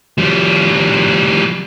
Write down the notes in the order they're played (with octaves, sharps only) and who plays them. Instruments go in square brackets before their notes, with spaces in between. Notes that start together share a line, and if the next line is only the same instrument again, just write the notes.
[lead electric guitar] F3 G3